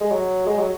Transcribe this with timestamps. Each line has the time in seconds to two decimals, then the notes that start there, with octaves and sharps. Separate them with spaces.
0.01 G#3
0.11 F#3
0.47 G#3
0.59 F#3